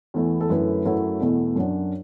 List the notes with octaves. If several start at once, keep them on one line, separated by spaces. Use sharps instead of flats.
E2 E3 A3 E4
A4
F#2 D3 A3 E4 B4
F#2 F#3 A3 E4
E2 B2 A3 E4
F#2 F#3 D4